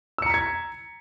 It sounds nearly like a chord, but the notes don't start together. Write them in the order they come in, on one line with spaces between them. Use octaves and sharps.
E6 C#7 A#5 B6 G#6